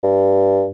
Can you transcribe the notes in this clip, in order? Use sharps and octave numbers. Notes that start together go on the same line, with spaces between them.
G2